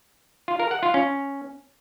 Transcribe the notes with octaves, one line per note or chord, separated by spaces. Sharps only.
F4
A#4
F#5
F4
C#4